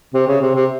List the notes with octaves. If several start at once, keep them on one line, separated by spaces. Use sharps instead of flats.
C3
C#3
C3
C3